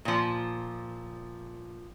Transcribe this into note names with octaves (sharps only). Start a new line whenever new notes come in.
A#2 F3